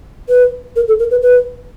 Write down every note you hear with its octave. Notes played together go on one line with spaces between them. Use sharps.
B4
A#4
A4
A#4
B4
B4